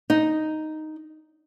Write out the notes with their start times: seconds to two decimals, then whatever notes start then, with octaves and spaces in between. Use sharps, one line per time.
0.10 D#4